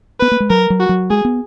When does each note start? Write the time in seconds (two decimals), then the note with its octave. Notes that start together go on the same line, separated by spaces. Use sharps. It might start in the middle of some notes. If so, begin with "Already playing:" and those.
0.20 B3 B4
0.32 A#3
0.40 G#3
0.50 F#3 A#4
0.70 F#3
0.80 F#4
0.89 F#3
1.10 G#3 G#4
1.25 B3